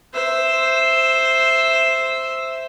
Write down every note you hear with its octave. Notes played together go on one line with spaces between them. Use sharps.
C5 E5